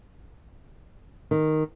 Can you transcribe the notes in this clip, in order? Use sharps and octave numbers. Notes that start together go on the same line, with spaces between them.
D#3